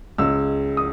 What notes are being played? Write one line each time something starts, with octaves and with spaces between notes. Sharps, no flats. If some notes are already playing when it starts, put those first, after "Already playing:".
C#2 C#3 G#3 E6
D#6